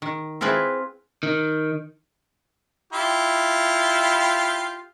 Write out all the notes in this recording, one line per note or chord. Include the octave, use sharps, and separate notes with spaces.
D#3
C4 E4 F4 G#4 B4
D#3
E4 F4 G4